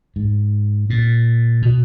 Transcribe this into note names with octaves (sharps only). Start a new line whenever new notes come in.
G#2
A#2
B2